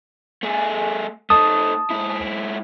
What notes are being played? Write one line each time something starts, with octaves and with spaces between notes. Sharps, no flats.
A3 G#4
A3 D#4 A5 D#6
G#2 E4